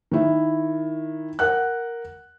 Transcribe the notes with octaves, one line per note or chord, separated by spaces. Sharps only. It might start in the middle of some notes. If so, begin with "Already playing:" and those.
D#3 E4
A#4 F#5 F#6